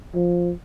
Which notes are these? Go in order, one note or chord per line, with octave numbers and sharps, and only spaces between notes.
F3